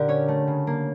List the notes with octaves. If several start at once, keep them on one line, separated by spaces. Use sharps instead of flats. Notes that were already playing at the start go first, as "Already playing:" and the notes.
Already playing: A#2 D3 G4 A#4
C#4 C#5
A3
C#3
A#3